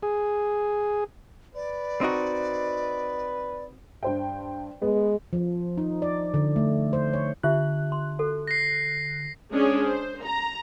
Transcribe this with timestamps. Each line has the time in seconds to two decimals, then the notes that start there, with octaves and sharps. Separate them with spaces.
0.03 G#4
1.55 B4 D5
2.01 C4 D#4 F#4
4.03 G2 C5 G5
4.82 G#3 B3
5.33 F3
5.78 D#4
6.02 D5
6.34 D3
6.56 A3
6.93 C5
7.13 C#5
7.43 D3 F4 G4 E5 F#6
7.92 C6
8.19 F#4 A4
8.47 A#6 C7
9.53 G#3 C#4 D4 G#4 C#5
9.85 C5
10.23 A#5